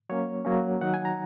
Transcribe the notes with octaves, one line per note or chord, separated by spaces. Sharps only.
F#3 A#3 C#4 C#5
F#3 A#3 C#4
D#3 F#3 D#4 F#5
G#5
A#5